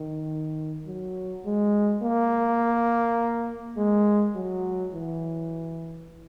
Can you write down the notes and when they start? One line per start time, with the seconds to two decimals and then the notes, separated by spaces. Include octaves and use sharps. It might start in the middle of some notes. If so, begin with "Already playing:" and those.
Already playing: D#3
0.86 F#3
1.45 G#3
2.03 A#3
3.77 G#3
4.35 F#3
4.94 E3